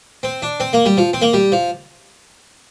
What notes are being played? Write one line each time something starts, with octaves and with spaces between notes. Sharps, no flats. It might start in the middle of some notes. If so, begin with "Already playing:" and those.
C4
D4
C4
A#3
G3
F3
C4
A#3
G3
F3